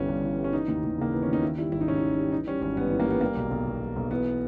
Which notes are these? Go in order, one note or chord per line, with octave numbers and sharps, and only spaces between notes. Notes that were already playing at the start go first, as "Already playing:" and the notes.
Already playing: G1 E3 G3 C#4
G2
E3
G3
C#4
E3 D#4
D#2
D#2
C#3 A#3
E3 B3
C#4
D#2 D#4
D#3 E4
G3 E4
G#1 E4
D#4
G#2 C#4
D#4
D#3
G3
E3 D#4
G3 C#4
G#1 C#4
G2 B3
E3
A#3
G3 B3
G3 A#3
B1
B1
B2
G3
B1
E3 B3